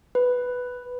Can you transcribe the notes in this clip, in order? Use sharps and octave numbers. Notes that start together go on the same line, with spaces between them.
B4